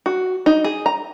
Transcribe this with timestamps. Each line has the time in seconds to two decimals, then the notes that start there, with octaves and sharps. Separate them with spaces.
0.06 F#4
0.46 D#4
0.64 G#4
0.86 A#5